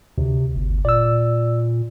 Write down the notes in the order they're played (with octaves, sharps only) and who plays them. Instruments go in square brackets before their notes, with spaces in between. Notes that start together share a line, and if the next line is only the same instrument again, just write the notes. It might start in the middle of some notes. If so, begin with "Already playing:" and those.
[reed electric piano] D2 [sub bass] C3
[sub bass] G1
[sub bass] A#2 [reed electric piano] D5 E6